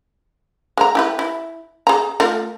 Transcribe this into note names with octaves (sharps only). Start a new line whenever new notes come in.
G#3 A#5
E4 G4 B4
E4
G#4 A#5
A3 F4 A#4